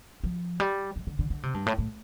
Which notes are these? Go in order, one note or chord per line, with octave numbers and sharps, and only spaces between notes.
F3
G3
F3
D3
D3
D3
C3
G2
A2
A2